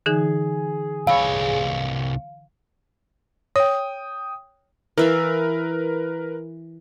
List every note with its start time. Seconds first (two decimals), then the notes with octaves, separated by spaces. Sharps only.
0.06 D3 E3 D#4 G#4
1.07 C2 C#5 F5 B5 E6
3.56 C#5 G5 D#6
4.98 E3 A#4 B4 E5 F5